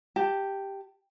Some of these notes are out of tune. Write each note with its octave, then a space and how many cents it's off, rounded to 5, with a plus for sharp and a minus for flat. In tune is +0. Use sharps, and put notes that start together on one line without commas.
G4 +0 A5 +20